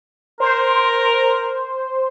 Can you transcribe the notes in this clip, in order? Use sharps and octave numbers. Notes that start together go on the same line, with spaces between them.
A#4 C5